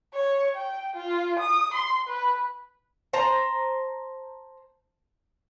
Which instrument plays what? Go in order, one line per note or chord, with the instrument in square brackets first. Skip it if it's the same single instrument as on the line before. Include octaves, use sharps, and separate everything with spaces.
[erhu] C#5
G5
F4
D#6
C6
B4
[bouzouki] C5 A5 A#5